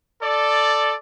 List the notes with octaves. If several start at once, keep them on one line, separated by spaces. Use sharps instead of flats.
A4 D5